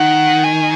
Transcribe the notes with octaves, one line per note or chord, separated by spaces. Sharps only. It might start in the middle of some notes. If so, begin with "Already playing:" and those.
Already playing: D#3 F#5
G#5